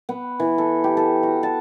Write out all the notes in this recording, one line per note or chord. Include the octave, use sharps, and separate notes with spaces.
B3
E3
A4
G4
A4
F#4
A5